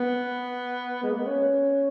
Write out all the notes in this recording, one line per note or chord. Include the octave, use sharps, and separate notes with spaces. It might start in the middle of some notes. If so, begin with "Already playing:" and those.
Already playing: B3
G#3
A#3
B3
C#4